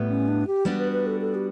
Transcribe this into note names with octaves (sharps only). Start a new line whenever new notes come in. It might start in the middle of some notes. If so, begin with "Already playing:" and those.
Already playing: A2 G3 B3
C#4
D4
G4
G3 B3 D4 F#4
B4
B4
A4
A4
G4